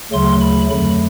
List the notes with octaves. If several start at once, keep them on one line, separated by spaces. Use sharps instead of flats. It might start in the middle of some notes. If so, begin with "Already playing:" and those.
D2 C#3 F#3 A3 C6
B5
F2 D3 F#3 A3 B5